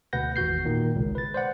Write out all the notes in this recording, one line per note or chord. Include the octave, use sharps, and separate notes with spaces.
D2 B2 B4 F#5 G6 A#6
G#1 E2 F#4 G6 C7
A#2 D#3
G#1 C#2 B2
B4 A6
C5 D5 F#5